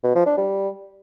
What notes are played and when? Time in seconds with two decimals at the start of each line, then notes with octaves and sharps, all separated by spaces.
0.04 B2
0.15 F3
0.26 D4
0.37 G3